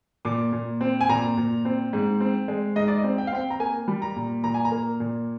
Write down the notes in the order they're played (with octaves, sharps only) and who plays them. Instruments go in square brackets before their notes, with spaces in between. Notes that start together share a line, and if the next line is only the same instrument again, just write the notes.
[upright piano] A#2 D6
A#2
C4
G#5
A#2 A#5
A#2
C4
G#2
C4
G#3
G#2 D#5
D5
D#5
C4
G5
F5
C4 G5
A#5
A#3 G#5
G3
A#5
A#2
A#2 A#5
G#5
A#5
A#3
A#2